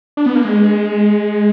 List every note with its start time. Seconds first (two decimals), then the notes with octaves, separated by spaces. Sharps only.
0.17 D4
0.26 B3
0.35 A#3
0.45 G#3